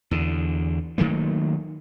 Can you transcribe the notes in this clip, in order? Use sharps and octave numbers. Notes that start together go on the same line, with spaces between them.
E2 D3
D#3 F#3 A3 A#3